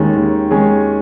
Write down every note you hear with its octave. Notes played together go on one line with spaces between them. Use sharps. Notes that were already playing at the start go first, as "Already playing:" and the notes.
Already playing: D#2 D#3 G#3 C#4 G#4
D#2
D#3 G#3 C#4 G#4